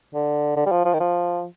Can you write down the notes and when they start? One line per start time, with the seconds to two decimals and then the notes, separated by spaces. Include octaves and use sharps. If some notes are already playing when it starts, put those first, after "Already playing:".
0.14 D3
0.57 D3
0.66 G3
0.72 F3
0.85 F3
0.94 D#3
1.00 F3